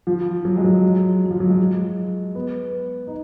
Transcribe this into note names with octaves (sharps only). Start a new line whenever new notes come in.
F3
F#3
G#3
F#3
F#3
F3
F#3
G#3
B3
D#4